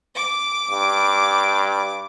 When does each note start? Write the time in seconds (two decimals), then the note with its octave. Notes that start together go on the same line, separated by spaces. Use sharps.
0.16 D6
0.71 G2